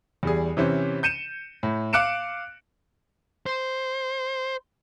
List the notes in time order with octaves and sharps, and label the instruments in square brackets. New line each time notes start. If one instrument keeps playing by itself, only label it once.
[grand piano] E2 G3 G#4
C3 E3 C#4 C5
G6 C#7 D#7 E7
A2
F5 D6 F#6 C#7 D7 E7
[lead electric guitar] C5